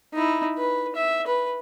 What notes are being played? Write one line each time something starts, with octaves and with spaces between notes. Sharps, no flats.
D#4 E4
B4
E5
B4